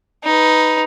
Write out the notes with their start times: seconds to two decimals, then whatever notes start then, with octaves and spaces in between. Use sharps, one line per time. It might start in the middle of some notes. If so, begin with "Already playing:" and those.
0.24 D#4 B4